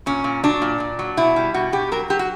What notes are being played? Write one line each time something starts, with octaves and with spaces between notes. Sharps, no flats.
A#2 C#4
A#2
F#3 D4
A#2
A#2
F#3
B2 E4
G3
B2 F#4
B2 G4
F#3 A#4
F#3 G4
F#4